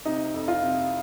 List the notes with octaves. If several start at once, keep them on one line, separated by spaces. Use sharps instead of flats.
C3 D#4
F2
F4
C3